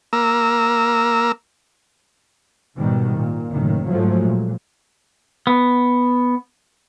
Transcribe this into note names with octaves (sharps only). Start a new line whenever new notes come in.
A#3 A#5 E6
G#2 B2 D#3 G3
A#2
F#1 A2 D#3
G#2 F3 F#3 G#3 A3
A#2
B3